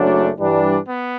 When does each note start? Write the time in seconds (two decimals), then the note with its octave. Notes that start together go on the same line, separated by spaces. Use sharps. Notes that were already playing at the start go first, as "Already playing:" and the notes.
Already playing: F#1 F#2 F#3 A3 D4
0.40 G2 E3 G3 D4
0.87 B3